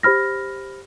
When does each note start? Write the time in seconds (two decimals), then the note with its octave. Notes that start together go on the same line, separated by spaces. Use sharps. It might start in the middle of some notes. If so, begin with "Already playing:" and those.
0.03 G4 C5 B5 F6 A#6